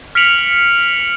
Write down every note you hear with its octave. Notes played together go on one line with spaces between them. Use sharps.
F6 B6 C#7 D7 F7 F#7